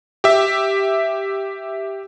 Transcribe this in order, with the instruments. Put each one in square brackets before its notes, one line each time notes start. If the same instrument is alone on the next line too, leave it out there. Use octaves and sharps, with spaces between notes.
[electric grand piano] G4 E5